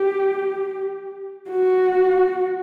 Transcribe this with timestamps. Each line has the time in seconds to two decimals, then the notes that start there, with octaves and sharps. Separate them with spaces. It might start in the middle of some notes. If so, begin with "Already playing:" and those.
Already playing: G4
1.50 F#4